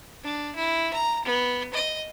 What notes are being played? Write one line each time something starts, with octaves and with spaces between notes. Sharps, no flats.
D4
E4
A#5
B3
D#5